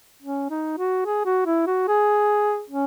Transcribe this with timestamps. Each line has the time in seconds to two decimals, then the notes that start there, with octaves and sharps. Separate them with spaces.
0.22 C#4
0.50 D#4
0.78 F#4
1.05 G#4
1.25 F#4
1.46 E4
1.66 F#4
1.88 G#4
2.70 C#4